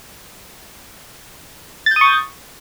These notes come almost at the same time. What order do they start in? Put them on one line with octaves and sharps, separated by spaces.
A6 G6 D#6 C#6